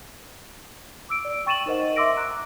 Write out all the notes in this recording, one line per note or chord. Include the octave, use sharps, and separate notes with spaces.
D6 E6 D7
D5
G5 C#6 A6 D#7 E7 F#7
D#4 A#4 C5 D#5 F#5
E5 C6 D6 E6 A#6 D7
A#5 F#6